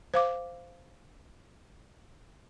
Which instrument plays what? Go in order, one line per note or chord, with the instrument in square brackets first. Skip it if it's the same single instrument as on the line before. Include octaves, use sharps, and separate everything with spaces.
[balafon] C5 F5 D6